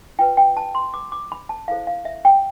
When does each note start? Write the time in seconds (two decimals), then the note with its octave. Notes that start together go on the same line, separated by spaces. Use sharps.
0.19 F4 B4 G5
0.37 G5
0.57 A5
0.75 C6
0.94 D6
1.12 D6
1.32 B5
1.49 A5
1.68 E4 A4 C5 F5
1.87 F5
2.05 E5
2.25 G5